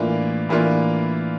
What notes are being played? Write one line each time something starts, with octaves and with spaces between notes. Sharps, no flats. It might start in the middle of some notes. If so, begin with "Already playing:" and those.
Already playing: A2 E3 A#3 D4 F4
A2 E3 A#3 D4 F4